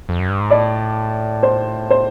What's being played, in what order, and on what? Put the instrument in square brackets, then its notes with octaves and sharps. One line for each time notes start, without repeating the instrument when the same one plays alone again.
[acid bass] F2
F#2
G2
G#2
[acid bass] A2 [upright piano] D5
[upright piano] C5
C5